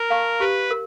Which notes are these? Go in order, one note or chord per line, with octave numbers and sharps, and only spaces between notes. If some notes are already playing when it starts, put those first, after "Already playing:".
Already playing: A#4
F5 A5 C#6
G4 B4
A#4